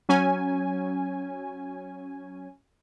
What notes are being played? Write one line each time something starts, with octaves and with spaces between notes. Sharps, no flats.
F#3 C#4 G#5